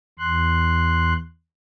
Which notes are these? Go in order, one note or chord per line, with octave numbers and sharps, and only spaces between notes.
E2 C6 F#6